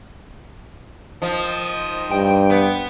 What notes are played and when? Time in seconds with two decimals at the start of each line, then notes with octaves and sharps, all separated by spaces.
1.22 D#3 F3 C5 D#5
2.11 G2 G5
2.50 B3